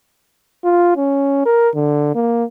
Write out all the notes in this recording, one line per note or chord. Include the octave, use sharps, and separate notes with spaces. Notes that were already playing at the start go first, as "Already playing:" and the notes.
F4
C#4
A#4
D3
A#3